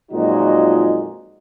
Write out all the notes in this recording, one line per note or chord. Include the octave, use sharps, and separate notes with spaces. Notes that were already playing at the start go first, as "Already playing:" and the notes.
F2 A#2 F#3 G#3 D#4 F#4